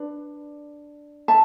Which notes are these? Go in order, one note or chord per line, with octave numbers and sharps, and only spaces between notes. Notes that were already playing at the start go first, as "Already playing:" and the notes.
Already playing: D4 B4 D5
E5 A5